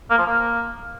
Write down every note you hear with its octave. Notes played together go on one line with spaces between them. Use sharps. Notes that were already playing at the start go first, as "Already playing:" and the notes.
A#3
F3
A#3